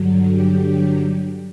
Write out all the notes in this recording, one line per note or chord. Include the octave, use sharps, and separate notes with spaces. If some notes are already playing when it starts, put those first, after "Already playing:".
Already playing: G2 D3 F#3
G4